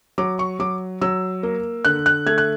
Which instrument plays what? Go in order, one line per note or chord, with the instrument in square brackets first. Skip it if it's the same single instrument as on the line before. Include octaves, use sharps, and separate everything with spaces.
[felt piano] F#3 D6
C#6
F#3 D6
F#3 E6
A#3
D3 F#6
F#6
A3 G#6
F#6